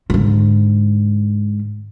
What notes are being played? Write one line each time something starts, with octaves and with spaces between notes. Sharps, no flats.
G#2 D3